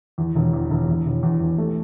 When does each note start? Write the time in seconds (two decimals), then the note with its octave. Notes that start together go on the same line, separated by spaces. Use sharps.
0.18 E2
0.35 E1
0.53 E2
0.71 E1
0.88 E2
1.06 E1
1.23 E2
1.40 E2
1.58 A3